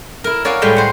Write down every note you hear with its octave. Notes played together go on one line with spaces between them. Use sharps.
E4 A#4
A#4 C#5 D5 F5 F#5 G#5
A2 G3 G#3 D#5 G5
C5 F#5